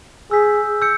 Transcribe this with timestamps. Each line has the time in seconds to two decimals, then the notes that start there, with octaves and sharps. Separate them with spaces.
0.31 G#4 E6 G6 B6
0.82 E6 G6 C#7